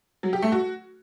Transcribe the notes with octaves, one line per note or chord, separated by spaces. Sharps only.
F#3
G4
A3
F#4